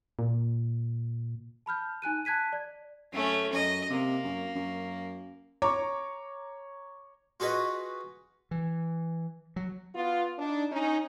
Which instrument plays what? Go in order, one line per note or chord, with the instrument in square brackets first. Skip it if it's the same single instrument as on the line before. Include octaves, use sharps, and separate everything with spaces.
[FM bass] A#2
[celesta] A5 B5 F6 G6
D#4 G#5 F#6 D#7
A5 F#6 G#6 B6 D#7
D5
[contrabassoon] F#2 [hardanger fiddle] A3 C#4
[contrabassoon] F#2 [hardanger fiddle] D#5
[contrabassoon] C3 [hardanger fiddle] A#3
[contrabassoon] F#2
F#2
[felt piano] C#5 A#5 C#6 D6
[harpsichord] F4 F#4 G#4 B4 D#5
[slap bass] E3
F#3
[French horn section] B3 F4
D4 D#4
C#4 D#4